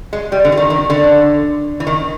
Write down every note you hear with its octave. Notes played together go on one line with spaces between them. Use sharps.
G#3
G3
D3
E3
D#3
D#3
D3
E3
D#3